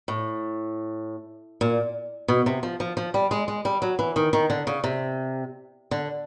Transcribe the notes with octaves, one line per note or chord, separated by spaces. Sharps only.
A2
A#2
B2
C3
F3
F3
F3
G3
G#3
G#3
G3
F#3
E3
D#3
D#3
D3
C#3
C3
D3